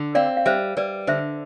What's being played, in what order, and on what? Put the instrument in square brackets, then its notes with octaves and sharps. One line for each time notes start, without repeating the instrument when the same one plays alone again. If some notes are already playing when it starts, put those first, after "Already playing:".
Already playing: [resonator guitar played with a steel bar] D3
[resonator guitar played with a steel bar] C4 [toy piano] D5 F5
[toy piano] F5
[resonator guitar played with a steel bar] G3 [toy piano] C5 E5
[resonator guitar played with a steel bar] G3 [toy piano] B4 D5
[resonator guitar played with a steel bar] D3 [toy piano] C5 E5